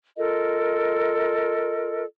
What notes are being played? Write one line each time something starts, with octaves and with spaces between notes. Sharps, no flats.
F4 A4 A#4 D#5